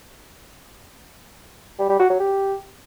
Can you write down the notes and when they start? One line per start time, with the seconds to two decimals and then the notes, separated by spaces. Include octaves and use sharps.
1.79 G3
1.89 G3
1.99 F#4
2.10 F#3
2.20 G4